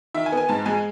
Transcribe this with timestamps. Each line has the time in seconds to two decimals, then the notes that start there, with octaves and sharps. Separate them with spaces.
0.14 D#3 E5
0.26 G#5
0.32 B3
0.37 G#5
0.49 G#2 A5
0.65 G#3 G#5